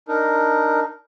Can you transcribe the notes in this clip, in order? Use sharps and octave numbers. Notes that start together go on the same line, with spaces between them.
D4 D#4 A#4